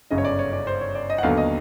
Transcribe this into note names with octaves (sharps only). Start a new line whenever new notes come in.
G1 F#2 C#3 D#5
C#5
D5
C#5
D5
C5
C#5
D5
D#5
F#5
D#2 D3 F#3 B3 F5
D#5